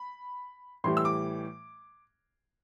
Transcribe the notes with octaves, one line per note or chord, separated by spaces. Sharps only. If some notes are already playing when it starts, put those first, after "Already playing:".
Already playing: B5
A2 E3 G3 C6
E6
D6